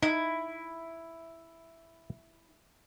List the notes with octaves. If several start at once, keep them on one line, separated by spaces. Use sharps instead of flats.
D#4 E4